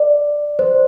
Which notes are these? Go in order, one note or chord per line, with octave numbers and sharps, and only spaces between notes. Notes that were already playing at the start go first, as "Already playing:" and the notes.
Already playing: D5
C5